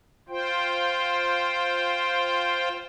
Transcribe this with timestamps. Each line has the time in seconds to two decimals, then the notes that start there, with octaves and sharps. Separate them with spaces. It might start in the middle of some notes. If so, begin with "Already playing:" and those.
0.29 F4 C5 G5